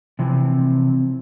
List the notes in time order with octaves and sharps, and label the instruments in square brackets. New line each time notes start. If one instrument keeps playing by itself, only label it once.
[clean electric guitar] C3 E3 F3 C4